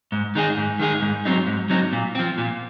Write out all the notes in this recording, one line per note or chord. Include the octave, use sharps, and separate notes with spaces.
G#2
D#3 G#3 D#4 G#4
G#2
D#3 G#3 D#4 G#4
G#2
F#3 C4 D#4
G#2
F#3 C4 D#4
A#2
F3 C4
A#2